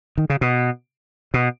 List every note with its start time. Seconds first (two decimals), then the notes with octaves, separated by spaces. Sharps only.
0.18 D#3
0.30 C#3
0.41 B2
1.34 B2